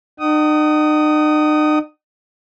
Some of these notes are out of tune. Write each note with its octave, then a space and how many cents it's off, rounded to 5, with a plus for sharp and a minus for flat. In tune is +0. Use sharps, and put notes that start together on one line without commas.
D#4 -45 F#5 +45 D#6 +0